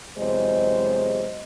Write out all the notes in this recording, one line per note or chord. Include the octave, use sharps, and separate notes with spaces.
E2 C3 F#3 G#3 C5 D#5